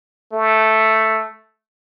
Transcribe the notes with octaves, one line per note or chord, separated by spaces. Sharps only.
A3